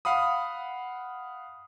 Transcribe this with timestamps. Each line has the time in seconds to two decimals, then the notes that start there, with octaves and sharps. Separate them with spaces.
0.05 F5 F#5 B5 D#6